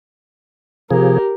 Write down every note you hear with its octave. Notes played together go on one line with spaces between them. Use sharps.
C3 F3 G4 G#4 A#4